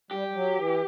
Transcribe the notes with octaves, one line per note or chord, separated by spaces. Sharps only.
G3 G4
G3
F#3
E3